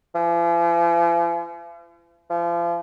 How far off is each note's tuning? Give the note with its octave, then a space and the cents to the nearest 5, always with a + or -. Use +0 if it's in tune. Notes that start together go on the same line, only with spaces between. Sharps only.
F3 -45
F3 -35